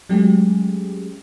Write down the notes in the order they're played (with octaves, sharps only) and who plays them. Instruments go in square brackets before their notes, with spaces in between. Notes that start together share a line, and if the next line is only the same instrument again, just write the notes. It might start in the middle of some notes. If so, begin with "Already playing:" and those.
[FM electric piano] F#3 G#3 A3 C#4 G4 G#4